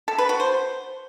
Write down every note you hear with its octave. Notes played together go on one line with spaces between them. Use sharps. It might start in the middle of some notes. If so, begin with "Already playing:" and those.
A4
B4
F#4
C5